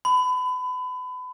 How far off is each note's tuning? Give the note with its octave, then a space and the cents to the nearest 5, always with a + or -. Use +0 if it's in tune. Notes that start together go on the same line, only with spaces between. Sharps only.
B5 +30